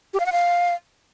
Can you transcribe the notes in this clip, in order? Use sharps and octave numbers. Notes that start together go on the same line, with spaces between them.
G4
F5
F#5
F5